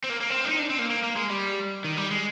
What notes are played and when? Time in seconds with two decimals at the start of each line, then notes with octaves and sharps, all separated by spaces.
0.04 C4
0.10 A#3
0.21 A#3
0.30 C4
0.44 D4
0.49 D#4
0.59 D4
0.70 C4
0.79 A#3
0.90 A#3
1.03 A#3
1.17 G#3
1.30 G3
1.84 D#3
1.97 G3
2.11 G#3